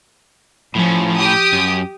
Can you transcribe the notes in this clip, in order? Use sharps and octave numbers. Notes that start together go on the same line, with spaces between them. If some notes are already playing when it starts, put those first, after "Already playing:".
A2 F3 C#4
G4 D#6
F#2